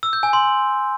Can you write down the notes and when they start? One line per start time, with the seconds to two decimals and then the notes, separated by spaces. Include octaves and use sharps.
0.03 E6
0.13 G6
0.23 G#5
0.33 C6